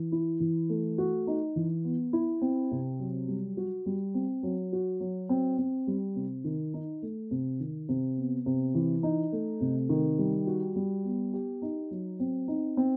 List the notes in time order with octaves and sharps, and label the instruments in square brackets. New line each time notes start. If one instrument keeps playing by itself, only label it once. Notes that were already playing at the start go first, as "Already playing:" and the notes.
Already playing: [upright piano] E3
E4
E3
A3
F#4
D#4
E3
B3
E4
C4
C3
F#3
G3
F#4
G3
C4
F#3
F#4
F#3
C4
C4
G3
C3
D#3
D#4
A3
C3
D#3
C3
B3
C3
E3
D#4
A3
C3
D#3
G3
F#4
G3
B3
G4
D#4
F#3
C4
D#4
C4